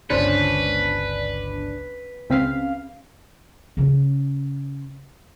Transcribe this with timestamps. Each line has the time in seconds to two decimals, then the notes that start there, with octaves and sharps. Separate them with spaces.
0.10 G1 C#2 C#4 D4 B4 C5
2.30 C#2 C#3 C4 F5 B6
3.77 C#3 C#4